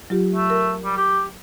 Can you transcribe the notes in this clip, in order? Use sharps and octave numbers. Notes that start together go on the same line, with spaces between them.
F#3 F4 G4
A3
A#4
G3
G4